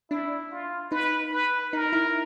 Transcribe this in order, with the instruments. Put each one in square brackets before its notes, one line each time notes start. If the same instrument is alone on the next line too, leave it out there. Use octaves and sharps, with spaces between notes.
[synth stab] D4 [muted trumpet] E4
[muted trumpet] F4
[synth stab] D#4 [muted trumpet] B4
[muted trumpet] B4
[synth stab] D#4 [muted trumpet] A#4
[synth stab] E4